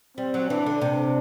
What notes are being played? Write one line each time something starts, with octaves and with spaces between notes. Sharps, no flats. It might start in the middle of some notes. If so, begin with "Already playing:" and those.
G3 C4
F#3
E3 D4
D3
C3 D4